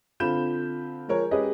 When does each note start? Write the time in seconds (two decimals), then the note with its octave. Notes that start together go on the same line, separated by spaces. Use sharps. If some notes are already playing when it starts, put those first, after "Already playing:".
0.20 D3 C4 F4 B5 G6 E7
1.08 F3 G#3 A#4 C#5
1.31 G#3 C#4 G4 G#4 B4 D#5